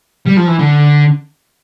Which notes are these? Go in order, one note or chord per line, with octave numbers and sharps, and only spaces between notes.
G3
F3
E3
D3